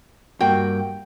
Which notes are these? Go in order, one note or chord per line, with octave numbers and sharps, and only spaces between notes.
G2 A#3 F#4 G5